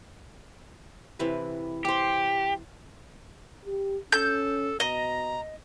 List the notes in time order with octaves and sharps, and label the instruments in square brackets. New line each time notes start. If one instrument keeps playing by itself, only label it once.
[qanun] C3 E3 B4
[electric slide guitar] G4 [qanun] C5 G5
[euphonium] G4
[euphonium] C#4 [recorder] A4 [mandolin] G6
[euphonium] B2 [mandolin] D#5 [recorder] A#5